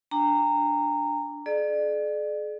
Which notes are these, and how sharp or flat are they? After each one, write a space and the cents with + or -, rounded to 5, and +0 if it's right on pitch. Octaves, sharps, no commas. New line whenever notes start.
D4 +0 G5 +40 A#5 -15
G#4 +45 D5 +30